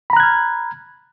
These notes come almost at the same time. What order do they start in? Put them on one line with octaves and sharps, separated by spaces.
B5 A#5 F#6 G#6 F6